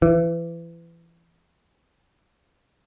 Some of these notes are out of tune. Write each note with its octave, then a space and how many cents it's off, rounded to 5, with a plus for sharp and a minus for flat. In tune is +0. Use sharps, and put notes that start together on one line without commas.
E3 +30